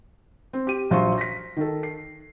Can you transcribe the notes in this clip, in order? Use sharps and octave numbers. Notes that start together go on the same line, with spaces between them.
C4
G4 D#7
A#1 F#3 F4 C5 C#6
A#6 B6
D#3 A4
C7